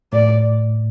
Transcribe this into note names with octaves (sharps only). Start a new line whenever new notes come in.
A2 D5